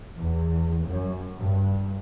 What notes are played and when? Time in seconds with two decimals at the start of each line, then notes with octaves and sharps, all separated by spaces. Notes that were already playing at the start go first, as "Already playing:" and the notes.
0.15 E2
0.86 F#2
1.38 G2